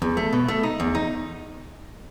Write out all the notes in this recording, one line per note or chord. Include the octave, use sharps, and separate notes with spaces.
E2
A3
B2
A3
D#4
E2
D#4